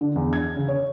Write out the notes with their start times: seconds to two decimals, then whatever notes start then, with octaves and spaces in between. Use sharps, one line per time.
0.01 D3
0.16 E2
0.33 G#6
0.56 C#3
0.68 C#5